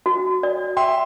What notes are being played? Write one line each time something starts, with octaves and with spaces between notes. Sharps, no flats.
F#4
D5
E5 G5 C6